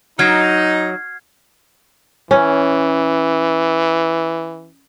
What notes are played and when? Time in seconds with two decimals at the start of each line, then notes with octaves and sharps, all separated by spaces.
0.19 F#3 D#4 F6 G#6 C7
2.31 E3 C#4